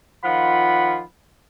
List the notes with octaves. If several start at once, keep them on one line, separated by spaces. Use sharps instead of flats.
D#3 F3 F4 F#5 B5